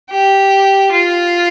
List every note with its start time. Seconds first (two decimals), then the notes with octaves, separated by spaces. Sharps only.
0.11 G4
0.91 F4